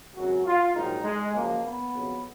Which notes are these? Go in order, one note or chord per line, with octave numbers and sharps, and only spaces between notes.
G#1 F#2 C#3 F#3 F#4
F4
A#1 G#2 D#3 F#3 D#4
G#3
F#2 C#3 F3 A#3
B3
F2 C#3 F#3